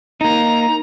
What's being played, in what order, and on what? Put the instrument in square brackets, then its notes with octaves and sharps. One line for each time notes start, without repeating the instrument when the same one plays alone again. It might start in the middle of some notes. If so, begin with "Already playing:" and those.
[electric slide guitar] A#3 D#4 [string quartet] A#5